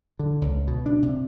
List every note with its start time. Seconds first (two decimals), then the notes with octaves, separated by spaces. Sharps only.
0.19 D3
0.41 C#2
0.67 B2
0.86 D4
1.03 C3